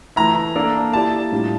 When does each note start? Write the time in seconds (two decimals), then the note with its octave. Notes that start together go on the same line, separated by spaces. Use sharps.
0.16 E3 A3 E4 A#5
0.56 A#3 D4 A4 D5
0.93 A#3 E4 G4 D5 A5
1.32 A2 G3 D4 F4